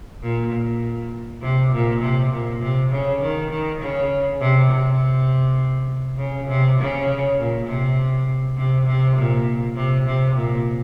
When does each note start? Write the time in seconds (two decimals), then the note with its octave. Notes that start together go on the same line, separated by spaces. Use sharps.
0.22 A#2
0.53 A#2
1.42 C3
1.72 A#2
2.01 C3
2.31 A#2
2.62 C3
2.92 C#3
3.21 D#3
3.51 D#3
3.81 C#3
4.40 C3
4.69 C3
6.18 C#3
6.48 C3
6.78 C#3
7.38 A#2
7.67 C3
8.57 C3
8.86 C3
9.16 A#2
9.76 C3
10.06 C3
10.35 A#2